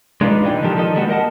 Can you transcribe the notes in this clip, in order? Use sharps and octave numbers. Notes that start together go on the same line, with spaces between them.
G#3 D4 D#4 F4 B4 D5
A#2 E3 D4 D#4 G5
D#3 F3 D4 G4 A4 A#4
D#3 F3 A#3 A4 D#5
G3 G#3 A#3 B3 D4 F#4
A#4 D#5 F#5 A5